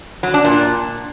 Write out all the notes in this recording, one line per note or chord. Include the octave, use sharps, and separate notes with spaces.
F#3
D4
A#2